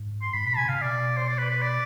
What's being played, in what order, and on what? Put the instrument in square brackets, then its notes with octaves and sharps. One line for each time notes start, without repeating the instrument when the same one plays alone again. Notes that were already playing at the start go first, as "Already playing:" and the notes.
Already playing: [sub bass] G#2
[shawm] C6
[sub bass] G#2 [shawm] B5
[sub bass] B2 [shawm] B5
[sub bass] C3 [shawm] G#5
[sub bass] C3 [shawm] F5
[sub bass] B2 [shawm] D5
[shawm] C5
D5
B4
B4
D5